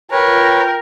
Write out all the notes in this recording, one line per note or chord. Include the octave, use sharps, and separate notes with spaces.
F4 A#4 B4 C#5 G5